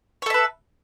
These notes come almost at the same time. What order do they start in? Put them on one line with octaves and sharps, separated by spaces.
C#5 A4 E5 B4